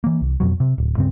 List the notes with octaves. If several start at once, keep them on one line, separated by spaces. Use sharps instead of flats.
E3 A#3
C2
F2 B2 F#3
C3
D1
C#2 G2 C#3 C4